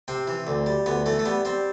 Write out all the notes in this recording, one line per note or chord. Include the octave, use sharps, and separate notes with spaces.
C3 C4
E3
D2
G3
D2 B3
E3 A3
A3
G3 B3
G3 C4